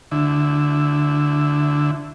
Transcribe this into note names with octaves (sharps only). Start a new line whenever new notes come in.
D2 D3 E4